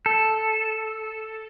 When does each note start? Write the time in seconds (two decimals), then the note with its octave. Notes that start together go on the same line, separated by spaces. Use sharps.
0.06 A4